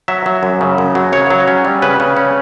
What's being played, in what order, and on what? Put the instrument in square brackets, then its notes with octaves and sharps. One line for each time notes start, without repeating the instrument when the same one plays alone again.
[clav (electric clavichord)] F#3 E5
F#3
F#2
C#3
F#2
F#3
C#3 C#5
F#3
C#4
G3
C#3 B4
C#3
C#4